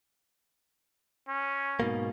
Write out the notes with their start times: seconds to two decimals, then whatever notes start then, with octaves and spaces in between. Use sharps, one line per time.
1.28 C#4
1.80 G#2 B2 A#3